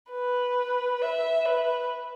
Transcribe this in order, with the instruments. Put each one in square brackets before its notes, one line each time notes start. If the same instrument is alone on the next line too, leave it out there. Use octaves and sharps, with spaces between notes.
[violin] B4
E5
B4